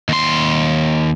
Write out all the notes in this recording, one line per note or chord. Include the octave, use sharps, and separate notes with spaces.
D#2 C6